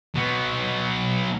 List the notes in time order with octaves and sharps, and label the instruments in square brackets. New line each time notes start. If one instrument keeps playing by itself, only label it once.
[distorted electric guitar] F#3 B3